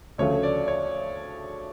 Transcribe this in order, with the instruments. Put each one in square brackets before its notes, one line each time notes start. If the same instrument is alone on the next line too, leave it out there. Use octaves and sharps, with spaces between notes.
[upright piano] D2 C#3 F3 A3 [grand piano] C#5
[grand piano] D5
C#5